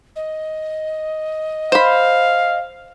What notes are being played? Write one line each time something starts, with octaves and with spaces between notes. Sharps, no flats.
D#5
C5 F5 B5